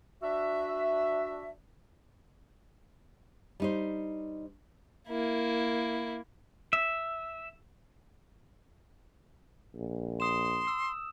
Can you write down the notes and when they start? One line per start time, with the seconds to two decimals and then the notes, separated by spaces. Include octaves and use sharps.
0.22 D4 F#4 E5
3.60 G3 D#4 C5
5.08 A#3 E4
6.73 E5
9.74 A#1
10.20 C6 D#6 E7
10.67 E6